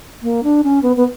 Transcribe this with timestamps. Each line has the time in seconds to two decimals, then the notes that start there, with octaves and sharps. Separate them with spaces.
0.23 A#3
0.44 D4
0.64 C#4
0.83 B3
0.97 B3